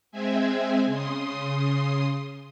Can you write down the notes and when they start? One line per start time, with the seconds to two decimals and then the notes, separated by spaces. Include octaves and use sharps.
0.12 G#3 C4 E5 G#5
0.85 C#3 C6 D#6